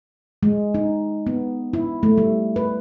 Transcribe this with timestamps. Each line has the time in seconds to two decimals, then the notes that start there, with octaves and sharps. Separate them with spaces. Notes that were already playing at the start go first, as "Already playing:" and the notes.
0.43 G#3
0.75 D#4
1.27 B3
1.73 E4
2.03 A3
2.18 G3
2.56 B4